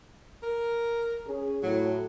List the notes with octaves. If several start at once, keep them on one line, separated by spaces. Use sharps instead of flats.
A#4
C#4 G#4
A2 F#3